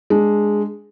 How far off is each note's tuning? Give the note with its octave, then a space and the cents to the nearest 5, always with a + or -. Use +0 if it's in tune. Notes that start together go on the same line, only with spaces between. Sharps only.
G#3 +0 D4 +0